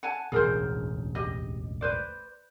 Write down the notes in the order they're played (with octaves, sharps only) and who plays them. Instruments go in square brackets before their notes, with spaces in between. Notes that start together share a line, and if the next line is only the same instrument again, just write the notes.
[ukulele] F#5 G#5 A5
[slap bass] E1 A1 D2 [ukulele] G#4 A#4 C5
[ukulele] G4 D#5
B4 C5 D5